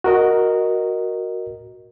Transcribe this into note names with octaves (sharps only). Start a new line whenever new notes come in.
F#4 A#4 D#5